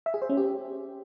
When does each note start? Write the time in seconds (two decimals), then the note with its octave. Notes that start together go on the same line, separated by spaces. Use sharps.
0.06 E5
0.14 G#4
0.22 C5
0.30 C#4
0.37 G4